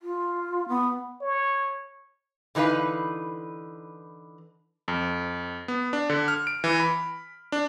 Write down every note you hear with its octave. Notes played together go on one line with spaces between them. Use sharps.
F4
B3
C#5
D3 E3 D#4 B4 F5
F2
B3
D4
D3
F6
D7
E3
B5
D4